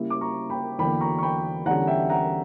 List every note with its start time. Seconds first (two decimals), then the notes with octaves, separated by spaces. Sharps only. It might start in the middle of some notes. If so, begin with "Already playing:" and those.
Already playing: C#3 G3 A#3 E4
0.10 D6
0.21 A#5 C#6
0.50 G5 B5
0.79 E2 D3 F#3 A#3 G5 B5
1.01 A#5 C#6
1.18 C#6
1.22 G5 B5
1.66 E2 D3 G3 C#4 F#5 A#5
1.87 E5 G5
2.09 F#5 A#5